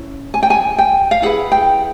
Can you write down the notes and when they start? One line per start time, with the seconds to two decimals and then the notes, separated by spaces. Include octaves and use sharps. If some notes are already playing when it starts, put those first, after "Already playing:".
Already playing: C#4 E4
0.34 G#5
0.43 G5
0.50 G#5
0.78 G5
1.11 F5
1.22 E4 G#4 B4 F#5
1.52 G5